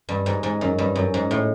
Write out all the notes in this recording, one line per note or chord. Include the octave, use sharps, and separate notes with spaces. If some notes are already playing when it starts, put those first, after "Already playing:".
G2
G#2
G#2
F#2
G2
F#2
G#2
A2